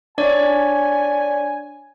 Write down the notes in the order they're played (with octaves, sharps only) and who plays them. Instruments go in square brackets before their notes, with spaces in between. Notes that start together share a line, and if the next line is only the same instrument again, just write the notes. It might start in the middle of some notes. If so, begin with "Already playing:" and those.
[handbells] D4 C#5 D5 [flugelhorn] G#5